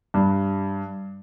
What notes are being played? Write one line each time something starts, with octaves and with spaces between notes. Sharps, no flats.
G2